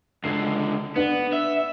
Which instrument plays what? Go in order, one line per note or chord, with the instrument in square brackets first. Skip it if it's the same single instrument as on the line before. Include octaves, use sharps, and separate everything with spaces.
[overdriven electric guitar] C#2 D3 [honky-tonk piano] C7
[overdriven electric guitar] B3 [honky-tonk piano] D4 B4
[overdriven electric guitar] E5